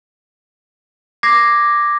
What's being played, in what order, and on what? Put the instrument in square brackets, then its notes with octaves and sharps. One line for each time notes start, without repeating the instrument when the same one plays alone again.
[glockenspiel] D6 G#6 A#6 C7